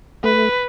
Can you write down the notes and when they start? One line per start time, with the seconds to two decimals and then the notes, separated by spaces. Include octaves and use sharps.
0.24 A3 B4